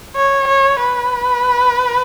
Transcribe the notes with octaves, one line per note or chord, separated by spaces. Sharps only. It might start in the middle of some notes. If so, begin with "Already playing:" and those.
C#5
C#5
B4